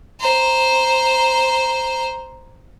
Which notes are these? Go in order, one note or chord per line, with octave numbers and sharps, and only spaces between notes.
C5 A#5